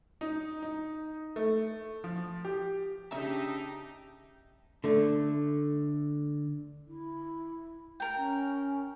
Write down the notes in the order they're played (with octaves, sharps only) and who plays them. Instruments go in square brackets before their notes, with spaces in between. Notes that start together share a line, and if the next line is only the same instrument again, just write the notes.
[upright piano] D#4
D#4
A3
F3
G4
[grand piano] C#3 D4 A#5 [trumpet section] D#4 [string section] G4 [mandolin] E5 A5
[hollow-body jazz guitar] D3 A3
[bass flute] E4
[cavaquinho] A#4 G5
[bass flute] C#4